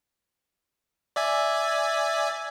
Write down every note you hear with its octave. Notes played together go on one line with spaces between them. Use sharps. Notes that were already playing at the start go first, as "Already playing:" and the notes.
D5 E5 G#5